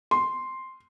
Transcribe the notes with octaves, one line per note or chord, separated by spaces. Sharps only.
C6